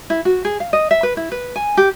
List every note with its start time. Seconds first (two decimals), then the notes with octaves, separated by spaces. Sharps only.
0.10 E4
0.25 F#4
0.45 G#4
0.60 F5
0.73 D#5
0.91 E5
1.03 B4
1.17 E4
1.32 B4
1.56 G#5
1.77 G4